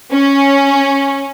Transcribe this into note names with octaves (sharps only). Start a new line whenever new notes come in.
C#4